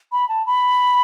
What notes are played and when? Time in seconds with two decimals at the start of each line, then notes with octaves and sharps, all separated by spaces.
0.12 B5
0.29 A5
0.46 B5